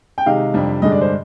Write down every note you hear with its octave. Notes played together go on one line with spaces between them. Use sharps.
G5
C3 D#3 G#3 D#4 F5
F2 C3 G3 D4
G2 D3 G#3 D4 D#5
D5
C5